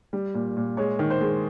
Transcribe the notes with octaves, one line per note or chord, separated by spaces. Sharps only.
G3
A#2
A#2
G#3 C#5
D#3
C5
G#3